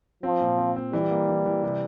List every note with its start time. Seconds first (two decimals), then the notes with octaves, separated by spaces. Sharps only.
0.23 F3 C4
0.41 A#2
0.58 C4
0.76 C4
0.93 E3 G3
1.11 A#3
1.29 E3
1.46 E3
1.63 C3